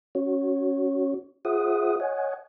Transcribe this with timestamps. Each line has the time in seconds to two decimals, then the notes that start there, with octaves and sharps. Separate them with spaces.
0.15 C#4 F#4 C#5
1.45 F4 G#4 C5 E5 F#5 D#6
2.00 C#5 D#5 F#5 G#5